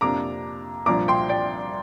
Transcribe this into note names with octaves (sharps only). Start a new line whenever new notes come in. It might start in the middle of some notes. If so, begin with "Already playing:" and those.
F2 C3 A#3 D4 A#5 D6
C2 A#2 F3 D4 A#5 D6
G5 C6
D5 G5